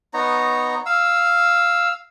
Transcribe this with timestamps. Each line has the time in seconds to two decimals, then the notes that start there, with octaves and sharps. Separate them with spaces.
0.14 B3 D#4 C#5 A#5
0.86 F5 E6